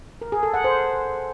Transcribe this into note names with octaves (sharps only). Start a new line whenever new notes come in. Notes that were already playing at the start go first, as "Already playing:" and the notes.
A#4
G#4
A4
F#5
C5